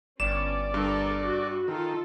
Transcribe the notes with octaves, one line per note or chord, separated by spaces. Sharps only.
G1 C#4 D5 E7
G2 A4 A#4
F#4
D#3 F4 A4